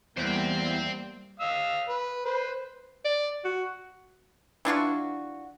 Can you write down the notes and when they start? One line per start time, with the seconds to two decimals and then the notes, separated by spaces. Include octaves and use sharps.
0.17 E2 G3 A#3 C5 G5
1.40 F5 D#6 E6
1.89 B4
2.25 B4 C5
3.05 D5
3.44 F#4
4.65 E3 D4 F4 F#4